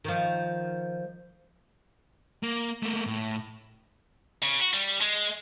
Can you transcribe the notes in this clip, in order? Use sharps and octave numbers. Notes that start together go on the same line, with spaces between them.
D#3 F3
A#3
A3 A#3
A2
C#3
F#4
G3
G#3